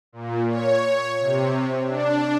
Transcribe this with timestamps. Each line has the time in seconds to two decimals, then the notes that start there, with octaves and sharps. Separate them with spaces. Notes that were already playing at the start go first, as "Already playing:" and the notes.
0.13 A#2
0.49 C#5
1.20 C3
1.86 D4